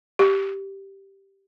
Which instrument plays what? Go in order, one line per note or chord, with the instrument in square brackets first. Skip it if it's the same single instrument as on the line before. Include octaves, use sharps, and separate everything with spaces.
[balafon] G4